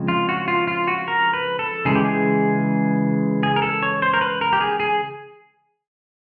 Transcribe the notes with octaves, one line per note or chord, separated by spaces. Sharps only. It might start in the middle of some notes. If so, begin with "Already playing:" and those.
Already playing: C#3 F3 G#3 C4
F4
F#4
F4
F4
F#4
A#4
B4
A4
C#3 E3 G#3 G#4
G4
G#4
G#4
A#4
A4
C#5
C5
A#4
B4
A#4
G4
G#4
G#4